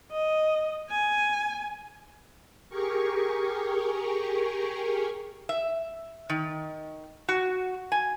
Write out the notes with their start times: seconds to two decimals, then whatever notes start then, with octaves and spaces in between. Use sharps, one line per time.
0.11 D#5
0.90 G#5
2.69 G4 G#4 A#4 C#6
5.49 E5
6.29 D#3
7.29 F#4
7.92 G#5